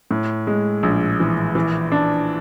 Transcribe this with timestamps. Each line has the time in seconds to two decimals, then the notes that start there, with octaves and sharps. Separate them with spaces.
0.11 A2
0.47 G#3
0.83 A#1
1.20 E3
1.55 E3
1.92 D4